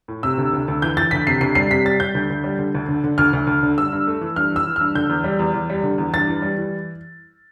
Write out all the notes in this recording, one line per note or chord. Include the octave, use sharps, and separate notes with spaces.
A2
C3 E6
D2
D2
D2
E3 G6
E3 A6
D2 B6
C3 C7
D2 C7
G3 C7
C3 B6
G3 A6
G3 G6
D2
D2
G3
D3
D2
D3
D3
D2 F6
D2
D2
D3
G2 E6
G2
A3
E3
G2 F6
E3 E6
E3
G2 F6
D3 G6
E2
G3
E2
E2
G3
D3
E2
G2 A6
E3
G3
E3